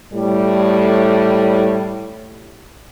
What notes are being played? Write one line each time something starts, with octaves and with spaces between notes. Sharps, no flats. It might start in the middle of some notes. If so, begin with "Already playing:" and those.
A2 G3